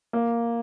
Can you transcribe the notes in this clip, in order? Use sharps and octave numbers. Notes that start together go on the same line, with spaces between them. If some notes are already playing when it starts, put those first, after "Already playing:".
A#3